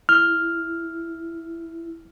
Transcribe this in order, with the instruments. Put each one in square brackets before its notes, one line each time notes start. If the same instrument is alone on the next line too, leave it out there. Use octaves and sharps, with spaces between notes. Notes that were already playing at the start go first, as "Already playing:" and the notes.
[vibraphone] E4 [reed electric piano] F6